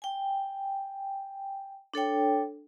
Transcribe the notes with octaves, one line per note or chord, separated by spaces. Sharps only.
G5 G#5
D4 A4 C#5 G5